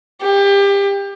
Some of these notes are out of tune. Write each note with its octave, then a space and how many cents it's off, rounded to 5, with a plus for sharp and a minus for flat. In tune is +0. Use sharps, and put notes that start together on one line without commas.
G4 +25